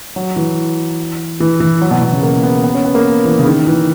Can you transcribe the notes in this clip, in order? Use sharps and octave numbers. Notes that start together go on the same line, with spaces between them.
F#3
E3
E3
E3
F#3
B2
B2
C#3
A#3
B3
B3
C#4
B3
A#3
E3
C#3
D#3
E3